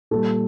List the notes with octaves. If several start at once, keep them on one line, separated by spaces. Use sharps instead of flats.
A#2 G3 A4